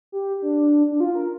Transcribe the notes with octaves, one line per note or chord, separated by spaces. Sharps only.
G4
D4
D4
F4
A#4